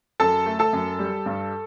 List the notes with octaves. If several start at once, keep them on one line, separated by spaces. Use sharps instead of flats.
F#2 A4 A5
A3
A4 A5
F#2
G3
G2